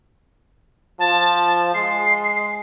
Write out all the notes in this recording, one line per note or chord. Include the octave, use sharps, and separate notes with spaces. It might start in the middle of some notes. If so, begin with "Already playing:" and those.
F3 A5
G#3 C7